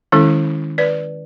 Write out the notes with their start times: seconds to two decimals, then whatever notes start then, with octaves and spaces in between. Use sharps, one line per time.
0.12 D#3 G#3 C#4 E4 A4
0.78 B4 D5